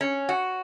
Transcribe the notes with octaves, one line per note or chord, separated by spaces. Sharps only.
C#4
F#4